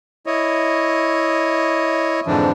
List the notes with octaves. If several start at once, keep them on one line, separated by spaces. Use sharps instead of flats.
E4 C#5 D#5
F2 G#2 D3 E3 F3 D4